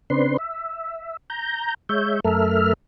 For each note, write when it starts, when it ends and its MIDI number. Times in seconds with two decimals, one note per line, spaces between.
0.10 0.37 49
0.10 0.37 60
0.10 0.37 62
0.10 0.37 71
0.10 0.37 84
0.38 1.17 76
1.30 1.74 82
1.30 1.74 91
1.89 2.20 56
1.89 2.20 73
1.89 2.20 76
1.89 2.20 91
2.24 2.73 42
2.24 2.73 57
2.24 2.73 69
2.24 2.73 70
2.24 2.73 76
2.24 2.73 89